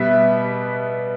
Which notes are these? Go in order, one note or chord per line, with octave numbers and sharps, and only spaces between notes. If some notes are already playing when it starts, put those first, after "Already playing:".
Already playing: B2 G3 B3 E5